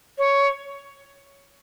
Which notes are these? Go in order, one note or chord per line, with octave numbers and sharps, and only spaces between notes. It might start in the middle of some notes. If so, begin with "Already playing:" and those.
C#5